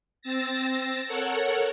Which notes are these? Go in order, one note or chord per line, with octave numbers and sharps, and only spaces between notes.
C4 E6 A6 A#6
A4 A#4 C#5 F#5